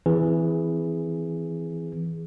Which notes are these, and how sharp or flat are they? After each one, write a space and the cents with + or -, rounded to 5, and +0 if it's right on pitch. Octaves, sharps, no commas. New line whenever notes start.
E3 +0 C4 -30 G#4 +0